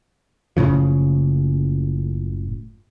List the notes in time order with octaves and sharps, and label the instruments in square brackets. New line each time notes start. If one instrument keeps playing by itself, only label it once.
[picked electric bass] F#1 A2 C#3 F3